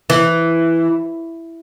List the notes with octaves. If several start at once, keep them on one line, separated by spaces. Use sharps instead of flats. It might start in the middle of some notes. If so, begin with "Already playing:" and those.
E3